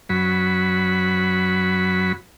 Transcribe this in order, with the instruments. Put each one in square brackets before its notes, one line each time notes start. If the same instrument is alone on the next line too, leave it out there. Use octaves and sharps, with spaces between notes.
[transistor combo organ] F#2 F#3 B5